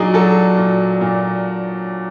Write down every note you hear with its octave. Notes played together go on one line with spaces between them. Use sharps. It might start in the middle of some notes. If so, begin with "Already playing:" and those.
Already playing: A#2 F#3 D4 D#4 G#4
F#3 A4
A#2
A#2